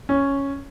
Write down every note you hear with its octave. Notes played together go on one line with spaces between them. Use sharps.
C#4